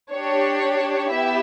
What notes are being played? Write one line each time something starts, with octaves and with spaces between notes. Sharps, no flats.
D4 G4 C#5
B3 E4 G4 E5